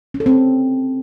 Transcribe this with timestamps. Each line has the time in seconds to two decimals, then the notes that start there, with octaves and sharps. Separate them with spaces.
0.14 C#4
0.20 A4
0.26 C4